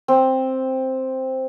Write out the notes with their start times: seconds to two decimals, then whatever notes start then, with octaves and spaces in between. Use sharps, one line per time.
0.08 C4